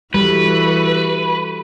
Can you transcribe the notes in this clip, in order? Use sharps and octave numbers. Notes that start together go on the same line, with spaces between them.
E3 G3 F#4 A4 B4